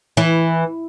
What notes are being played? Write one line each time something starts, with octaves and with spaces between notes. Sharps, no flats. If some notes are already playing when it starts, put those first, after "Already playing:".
E3